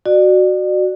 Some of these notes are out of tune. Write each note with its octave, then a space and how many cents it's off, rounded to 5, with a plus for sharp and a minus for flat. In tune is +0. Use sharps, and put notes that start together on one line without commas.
F#4 +0 D5 +35